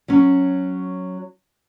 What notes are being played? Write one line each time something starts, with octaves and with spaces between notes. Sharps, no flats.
F#3 C#4